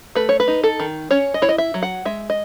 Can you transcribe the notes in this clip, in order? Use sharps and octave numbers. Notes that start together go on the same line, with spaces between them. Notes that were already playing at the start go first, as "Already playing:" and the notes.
A3 B4
C#5
B4
D#4
A4
D#3
C#4 C#5
D#5
E4 C#5
D#5
E5
F#3
F#5
G#3 E5
D#5